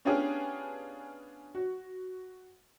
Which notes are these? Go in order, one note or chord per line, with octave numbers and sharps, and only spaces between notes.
B3 C#4 D4 F4 G4 G#4
F#4